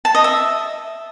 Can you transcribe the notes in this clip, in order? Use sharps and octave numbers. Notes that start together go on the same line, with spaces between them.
A5
D#5
E5